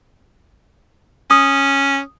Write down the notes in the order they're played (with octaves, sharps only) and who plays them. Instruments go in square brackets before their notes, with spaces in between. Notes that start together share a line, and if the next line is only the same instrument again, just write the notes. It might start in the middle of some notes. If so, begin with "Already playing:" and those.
[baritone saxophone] C#4 [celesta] D#6